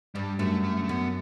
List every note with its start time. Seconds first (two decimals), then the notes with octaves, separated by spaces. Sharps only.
0.15 G2 G3
0.39 F#2 A3
0.64 A3
0.84 A3
0.89 F#2 B3